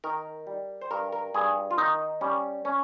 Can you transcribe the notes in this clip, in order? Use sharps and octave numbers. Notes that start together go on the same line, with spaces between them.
D#3 A#4
G3
C5
G2 A#4
A#4
G2 G#4
F4
D#3 D#4
G3 C#4
C#4